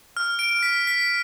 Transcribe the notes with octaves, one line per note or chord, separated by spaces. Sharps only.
F6
D7
B6
B6